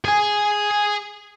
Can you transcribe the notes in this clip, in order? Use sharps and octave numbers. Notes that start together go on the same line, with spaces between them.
G#4 G#5